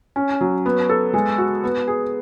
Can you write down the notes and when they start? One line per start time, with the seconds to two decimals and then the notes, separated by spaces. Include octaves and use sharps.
0.16 C#4
0.41 F#3
0.66 B3
0.89 A4
1.14 G#3
1.38 F#4
1.64 B3
1.87 G#4